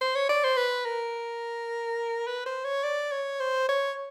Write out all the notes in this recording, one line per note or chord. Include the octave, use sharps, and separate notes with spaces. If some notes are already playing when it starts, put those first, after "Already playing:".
C5
C#5
D5
C5
B4
A#4
B4
C5
C#5
D5
C#5
C5
C#5